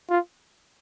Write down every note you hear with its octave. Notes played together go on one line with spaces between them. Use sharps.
F4